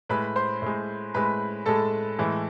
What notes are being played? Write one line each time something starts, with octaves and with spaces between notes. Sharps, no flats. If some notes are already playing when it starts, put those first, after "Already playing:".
A2 G#3 B4 B5
C5 C6
A2 G#3
A2 G#3 B4 B5
A2 G#3 A4 A5
A2 E3 G#3